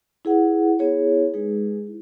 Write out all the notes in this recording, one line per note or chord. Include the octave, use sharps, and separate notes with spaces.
E4 G#4 B4 F#5
B3 E4 G#4 C#5
G#3 D#4 G#4 B4
E4